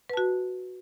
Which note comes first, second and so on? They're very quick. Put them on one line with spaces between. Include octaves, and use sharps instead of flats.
B4 A5 F#4